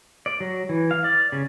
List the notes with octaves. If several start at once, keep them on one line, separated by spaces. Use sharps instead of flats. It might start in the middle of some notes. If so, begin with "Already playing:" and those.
D5
F#3
E3
F5
D5
C#3